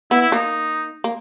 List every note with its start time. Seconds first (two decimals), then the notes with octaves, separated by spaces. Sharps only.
0.11 B3 E4
0.21 E4
0.32 A#3 D#4
1.04 A#3